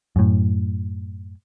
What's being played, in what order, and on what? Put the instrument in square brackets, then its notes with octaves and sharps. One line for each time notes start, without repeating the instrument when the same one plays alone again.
[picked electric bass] F#2 A2